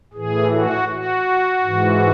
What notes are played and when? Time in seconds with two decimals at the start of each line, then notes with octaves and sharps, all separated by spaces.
0.13 A2 E3 G#4
0.51 F#4
0.89 F#4
1.63 G#2 E3